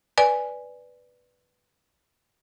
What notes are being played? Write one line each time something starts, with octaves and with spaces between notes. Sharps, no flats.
B4 D5 G#5